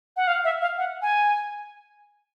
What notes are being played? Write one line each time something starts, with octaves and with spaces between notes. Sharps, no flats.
F#5
F5
E5
F5
F#5
G#5